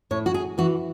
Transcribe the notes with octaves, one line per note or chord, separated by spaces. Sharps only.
A2 C#5
F#4
G#4
E3 F#4